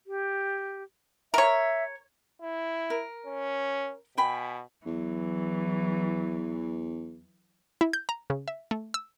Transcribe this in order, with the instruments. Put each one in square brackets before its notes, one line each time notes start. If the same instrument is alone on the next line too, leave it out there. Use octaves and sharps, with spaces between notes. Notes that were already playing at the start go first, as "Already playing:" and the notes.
[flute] G4
[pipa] A#4 C#5 [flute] E5
[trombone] E4
[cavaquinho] A#4
[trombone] C#4
[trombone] B2 [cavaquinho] G5 G#5 B5
[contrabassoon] E2 [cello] E3 F#3
[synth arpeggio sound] E4
G6
A#5
C#3
E5
A3
E6